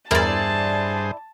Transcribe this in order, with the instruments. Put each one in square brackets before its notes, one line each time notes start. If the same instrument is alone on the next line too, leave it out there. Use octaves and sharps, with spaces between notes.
[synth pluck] E2 A#4 [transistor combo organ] G2 G#4 C5 [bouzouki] E4 D5 [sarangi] A5